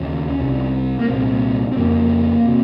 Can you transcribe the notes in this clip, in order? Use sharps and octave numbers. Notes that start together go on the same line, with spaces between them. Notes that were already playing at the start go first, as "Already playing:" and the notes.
Already playing: D#2 C#3 C#4
C2 C3
A#3
C2 A#2 C4
C4
F2 C#3 A#3
C3